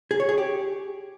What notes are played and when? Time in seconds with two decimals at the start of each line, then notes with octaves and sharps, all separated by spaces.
0.11 G#4
0.20 C#5
0.29 G#4
0.38 G4